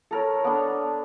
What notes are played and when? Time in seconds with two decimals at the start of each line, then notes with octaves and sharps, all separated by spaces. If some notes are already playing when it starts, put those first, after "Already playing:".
0.11 A4 A#4 C#5
0.44 B3 D4